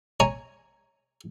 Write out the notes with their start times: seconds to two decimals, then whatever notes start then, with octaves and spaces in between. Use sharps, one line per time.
0.20 C#5 G#5 A#5